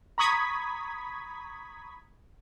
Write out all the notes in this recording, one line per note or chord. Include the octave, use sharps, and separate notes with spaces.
A#5 B5 C#6 D#6 G#6 B6